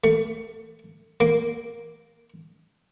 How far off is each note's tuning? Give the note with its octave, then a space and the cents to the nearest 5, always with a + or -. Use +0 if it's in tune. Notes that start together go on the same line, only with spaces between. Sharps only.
A3 +30
A#3 +0